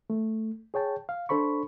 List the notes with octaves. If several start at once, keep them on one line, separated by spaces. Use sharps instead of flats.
A3
G#4 C#5 G5 A5
F5
D4 A4 C5 B5 C#6